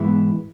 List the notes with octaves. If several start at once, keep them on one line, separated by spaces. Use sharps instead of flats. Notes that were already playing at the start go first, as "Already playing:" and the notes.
Already playing: G#2 E3 G#3 B3 E4